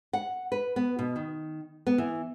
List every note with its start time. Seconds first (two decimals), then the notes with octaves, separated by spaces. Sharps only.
0.13 F#5
0.52 B4
0.76 B3
0.99 B2
1.16 D#3
1.87 B3
1.98 E3